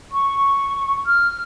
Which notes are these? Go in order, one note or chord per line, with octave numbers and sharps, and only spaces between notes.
C#6
F6